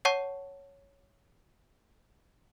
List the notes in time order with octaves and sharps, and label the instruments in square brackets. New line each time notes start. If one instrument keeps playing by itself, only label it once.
[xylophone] C#5 F#5 A5 C#6